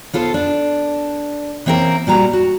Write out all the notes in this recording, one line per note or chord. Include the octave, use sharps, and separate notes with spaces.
B3 F4 A4 C5
D4
E3 A#3 C4 C#4 A#4
A#2 G3 F#4 A#5
F#4